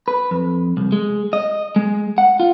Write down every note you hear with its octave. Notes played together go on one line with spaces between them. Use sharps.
B4
F2
C2
G#3
D#5
G#3
F#5
F4